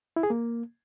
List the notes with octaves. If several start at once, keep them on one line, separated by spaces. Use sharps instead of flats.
E4
G#4
A#3